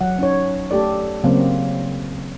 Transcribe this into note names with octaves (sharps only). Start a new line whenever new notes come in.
F#3 F#5
C#4 D#4 C#5
A3 G4 A4 D5
C#3 F#3 A#3 C4